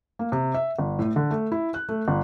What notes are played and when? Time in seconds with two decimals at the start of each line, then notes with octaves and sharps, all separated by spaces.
0.19 A#3
0.32 C3
0.55 E5
0.79 G1
0.99 A2
1.16 D3
1.30 A3
1.52 E4
1.74 F#6
1.89 A3
2.08 G1